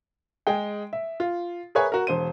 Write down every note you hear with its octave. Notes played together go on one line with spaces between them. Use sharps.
G#3 G#4 G5
E5
F4
G#4 A#4 B4 C#5 E5 G#5
F#4 A#4
E1 C5 D#7